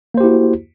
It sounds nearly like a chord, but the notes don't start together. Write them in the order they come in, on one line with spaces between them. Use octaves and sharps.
A#3 C5 G4 E4 F#4